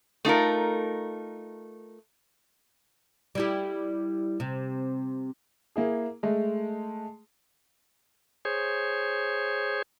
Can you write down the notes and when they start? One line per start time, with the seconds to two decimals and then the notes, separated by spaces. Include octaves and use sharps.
0.25 A3 D#4 F4 A#4
3.35 G3 E4 G4
4.40 C3
5.76 A#3 E4 G#4
6.23 G#3 A3
8.45 G#4 C5 C#5